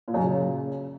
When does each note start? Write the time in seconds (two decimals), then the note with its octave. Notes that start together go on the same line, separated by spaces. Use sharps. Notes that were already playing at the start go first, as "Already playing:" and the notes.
0.08 A#2
0.14 F#2
0.21 C#3